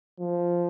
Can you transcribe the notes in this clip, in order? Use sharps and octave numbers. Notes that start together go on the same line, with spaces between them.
F3